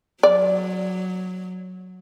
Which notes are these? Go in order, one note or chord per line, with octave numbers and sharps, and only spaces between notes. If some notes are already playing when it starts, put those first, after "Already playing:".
F#3 D5